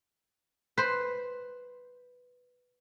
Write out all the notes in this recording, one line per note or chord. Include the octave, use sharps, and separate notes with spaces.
B4 C5